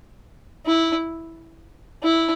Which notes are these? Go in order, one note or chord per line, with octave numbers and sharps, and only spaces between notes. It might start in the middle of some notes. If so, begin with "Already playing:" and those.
E4
E4